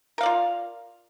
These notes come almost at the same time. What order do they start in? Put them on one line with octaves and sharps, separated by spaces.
A#4 F5 D5 F4